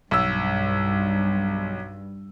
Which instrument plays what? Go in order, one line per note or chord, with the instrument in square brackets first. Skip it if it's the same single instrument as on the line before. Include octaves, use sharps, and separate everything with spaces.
[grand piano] B1 E6 [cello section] G2